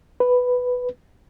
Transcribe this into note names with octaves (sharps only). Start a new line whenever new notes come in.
B4